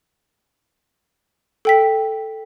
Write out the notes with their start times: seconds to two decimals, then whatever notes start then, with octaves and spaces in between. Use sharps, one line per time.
1.65 A4 G5 B6